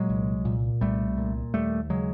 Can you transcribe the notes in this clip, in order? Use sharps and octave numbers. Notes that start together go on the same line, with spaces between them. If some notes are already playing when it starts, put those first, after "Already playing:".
Already playing: A#2 F#3 G#3
C2
A#2
C2 G3 A3
A#2
D#2 G3 A3
C#3 F#3 G#3